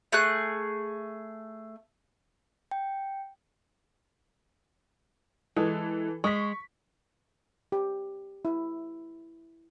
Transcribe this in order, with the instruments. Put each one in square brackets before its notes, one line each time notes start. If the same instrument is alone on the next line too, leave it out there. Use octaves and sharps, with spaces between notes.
[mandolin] A3 G#4 F#6
[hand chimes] G5
[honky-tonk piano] E3 A4 [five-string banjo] G#3
[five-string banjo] G#3 [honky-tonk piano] C#6 B6
[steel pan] G4
E4